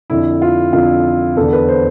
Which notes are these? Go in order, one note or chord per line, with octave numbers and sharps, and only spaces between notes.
F2 D3 E4
F4
F2 D3 F4
E2 D3 A4
B4
C5